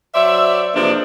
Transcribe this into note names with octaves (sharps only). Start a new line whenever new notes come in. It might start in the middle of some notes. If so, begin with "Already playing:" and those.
F#3 C5 D5 E5
C3 E3 F3 G#3 A#3 D4